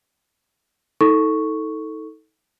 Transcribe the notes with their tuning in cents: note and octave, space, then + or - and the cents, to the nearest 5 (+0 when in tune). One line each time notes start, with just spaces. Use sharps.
D#4 +35 A4 +0 C#6 +0